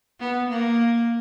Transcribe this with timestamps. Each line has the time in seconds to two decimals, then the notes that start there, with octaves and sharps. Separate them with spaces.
0.20 B3
0.50 A#3